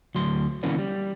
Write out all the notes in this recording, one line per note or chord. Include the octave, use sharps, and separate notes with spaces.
D2 F#3 C6
D3 E3 A#3 B3 C#4 D4
G3